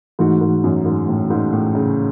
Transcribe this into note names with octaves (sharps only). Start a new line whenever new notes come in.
G#2 E3 A3 D#4 F#4
G#2
F#2
G#2
A2
G#2
A2
C#3